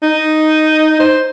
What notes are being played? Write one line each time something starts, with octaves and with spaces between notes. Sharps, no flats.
D#4
C5